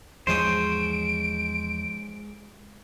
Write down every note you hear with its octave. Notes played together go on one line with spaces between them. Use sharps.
E2 G#2 F3 G#3 C#4 C5 D#6 D7